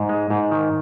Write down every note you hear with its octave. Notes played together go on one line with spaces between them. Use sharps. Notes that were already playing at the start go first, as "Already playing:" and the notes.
Already playing: G#2
G#3
G#2
D#3